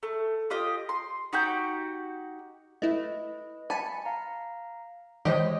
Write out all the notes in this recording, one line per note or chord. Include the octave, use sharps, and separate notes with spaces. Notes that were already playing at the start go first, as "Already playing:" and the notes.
A3
F4 G4 D#5
C6
D#4 F#4 G4 G6
A3 E4 B4 D#5
G#5 A5 B5 C#7
F5 A#5
D#3 E3 G#3 G4 C5 C#5 D#5 D#6